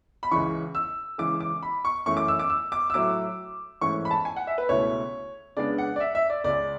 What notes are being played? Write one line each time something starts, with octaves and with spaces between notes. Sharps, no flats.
B5
C#2 C#3 E3 C#6
E6
C#3 E3 G#3 D6
D6
B5
C#6
F#2 E3 A3 C#6
D6
E6
D6
E6
D6
E6
A2 F#3 A3 E4 D6
G#2 E3 A3 C#4 C#6
B5
A5
G#5
F#5
E5
B4
C#2 B2 A3 E4 C#5
C#3 G#3 B3 D4 D5
F#5
D5
E5
E5
D5
C#2 C#3 G#3 D5